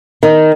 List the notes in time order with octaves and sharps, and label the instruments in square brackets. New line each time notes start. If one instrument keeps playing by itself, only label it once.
[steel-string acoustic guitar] D#3